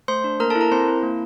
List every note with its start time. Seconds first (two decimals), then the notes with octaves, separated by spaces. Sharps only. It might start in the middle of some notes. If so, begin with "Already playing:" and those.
0.08 A3 C5 C6
0.24 D4
0.40 A#3 A#4 A#5
0.50 A4 A5
0.55 E4
0.61 A#4 A#5
0.71 C4 C5 C6
0.87 E4
1.03 A#3